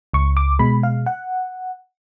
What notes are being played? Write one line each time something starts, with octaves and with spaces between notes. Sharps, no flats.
C#2 C#6
D6
B2 G#3 B5
F5
F#5